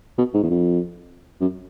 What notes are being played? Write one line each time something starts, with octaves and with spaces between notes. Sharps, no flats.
B2
G#2
E2
F2
F#2